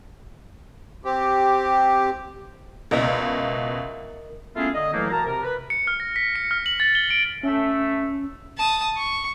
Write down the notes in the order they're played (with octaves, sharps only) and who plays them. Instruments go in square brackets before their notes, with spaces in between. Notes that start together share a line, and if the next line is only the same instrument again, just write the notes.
[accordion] C4 G4
[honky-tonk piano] C#2 B2 [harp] A#4 D#5 E5
[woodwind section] A3 B3 C#4 E4 F4 G#4
D3 D#5
A2 E3 F#3 A3 A#3
F#4 A#4 A5 A#5
C3 A#4
B4
[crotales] C#7
F6
A#6
B6
C#7
F6
F#7
A6
G7
D7
[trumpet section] A3 E5 [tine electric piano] C#4
[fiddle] A5 D#6
C#6